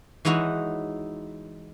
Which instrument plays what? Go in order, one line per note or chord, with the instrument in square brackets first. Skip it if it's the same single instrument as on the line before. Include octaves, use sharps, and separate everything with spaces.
[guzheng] E3 G#3 D#4 E4 F#4 C#5